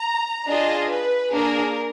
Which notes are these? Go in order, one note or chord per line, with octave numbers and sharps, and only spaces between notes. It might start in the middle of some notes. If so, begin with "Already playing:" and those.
Already playing: A#5
D4 F4 G#4 D#5
B4
A#3 D4 G#4 A#4